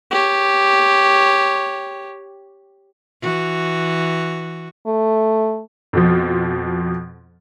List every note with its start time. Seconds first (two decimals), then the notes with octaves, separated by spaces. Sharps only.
0.11 G4 C#5
3.22 E3 F#4
4.87 A3
5.93 F2 B2 F3